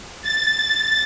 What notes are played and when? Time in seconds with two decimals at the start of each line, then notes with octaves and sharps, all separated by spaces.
0.22 A6